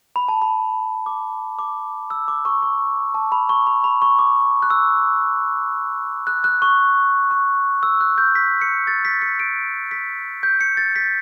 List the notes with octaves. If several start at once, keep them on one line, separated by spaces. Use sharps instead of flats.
B5
A5
B5
D6
D6
E6
D6
C#6
C#6
A5
B5
C#6
B5
B5
C#6
D6
F#6
E6
F#6
F#6
C#6
C#6
E6
F#6
G6
B6
C#7
A6
B6
C#7
D7
B6
G6
C#7
A6
B6